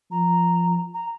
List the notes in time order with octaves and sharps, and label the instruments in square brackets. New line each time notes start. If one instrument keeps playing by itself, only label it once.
[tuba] F3 [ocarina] A#5
[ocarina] A#5